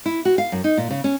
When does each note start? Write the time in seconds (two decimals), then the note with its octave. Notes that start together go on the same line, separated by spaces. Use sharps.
0.06 E4
0.25 F#4
0.38 F5
0.52 F#2
0.64 D#4
0.77 A#2
0.90 C#3
1.04 C#4